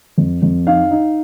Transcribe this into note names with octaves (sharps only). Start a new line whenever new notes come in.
F2
F2
D#4 F5
D#4